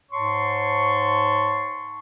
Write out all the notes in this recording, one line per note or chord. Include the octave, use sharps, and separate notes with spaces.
G#2 C#5 A5 C6 C#6